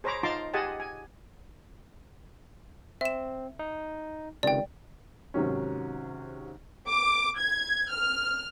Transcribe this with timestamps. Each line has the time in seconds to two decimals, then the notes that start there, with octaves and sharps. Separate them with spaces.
0.04 G#4 C5 C#5 A#5 B5 D6
0.23 D#4 F4 A5 A#5 C6 D6
0.54 G4 G#4 D#5 F#5 G#5 A5
0.80 G#5
3.01 C4 E5 E7
3.59 D#4
4.43 C#2 C3 D#3 D5 G5
5.34 G#2 C3 D#3 F#3 C#4
6.88 D6
7.39 G#6
7.91 F6